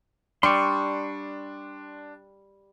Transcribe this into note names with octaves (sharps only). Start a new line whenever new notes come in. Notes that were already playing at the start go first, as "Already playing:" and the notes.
G3 D4 C6 C#6